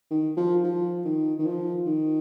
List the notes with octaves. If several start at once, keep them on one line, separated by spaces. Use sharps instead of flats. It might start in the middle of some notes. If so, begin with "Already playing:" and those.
D#3
F3
F3
D#3
D#3
F3
D#3